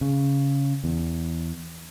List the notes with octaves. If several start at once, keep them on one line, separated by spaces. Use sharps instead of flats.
C#3
E2